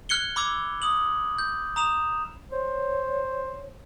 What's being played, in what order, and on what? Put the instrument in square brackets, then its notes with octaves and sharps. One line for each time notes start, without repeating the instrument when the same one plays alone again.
[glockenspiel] F6 F#6 G#6 C#7 G7
B5 D6 E6 G#6 F7
D#6 F#7
G6
A#5 D#6 E7 F7
[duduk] C5 [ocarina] C#5